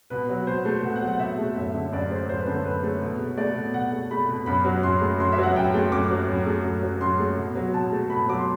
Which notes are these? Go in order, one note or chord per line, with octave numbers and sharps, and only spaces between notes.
B2 B4
F#3
B2 C5
A3
B2 F#5
F#5
F#3
F#5
B2 E5
A3
F#2 E5
D3
F#2 D5
A3 C5
F#2 C5
B4
D3
A4
F#2 B4
A3
B2
A3
A3 D5
B2
B2 F#5
A3
A3 B5
B2
F#2 B5
F#3
F#2 C6
A3
F#2 C6
E5
F#3
F#5
F#2 G5
A3
F#2 D6
F#3
F#2
A3
F#2
F#3
F#2 C6
A3
B2
F#3
B2 A5
A3
B2 B5
F#3 D6
C6